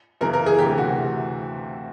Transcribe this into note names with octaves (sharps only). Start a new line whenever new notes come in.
F#2 C#3 E3 A#4
A#4
G#4
D2 C3 E3 G4
F#4